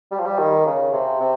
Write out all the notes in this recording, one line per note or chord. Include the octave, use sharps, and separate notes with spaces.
G3
F3
G3
D#3
C#3
C3
C3